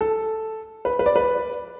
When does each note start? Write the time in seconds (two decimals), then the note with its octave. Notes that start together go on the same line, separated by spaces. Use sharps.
0.01 A4
0.85 B4
0.99 B4
1.06 D5
1.16 B4